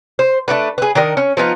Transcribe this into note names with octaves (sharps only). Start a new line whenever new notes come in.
C5
A3 D4 F#4 B4
G#4 B4
D#3 D4 A#4 D#5
C#4
F3 B3 D#4 F4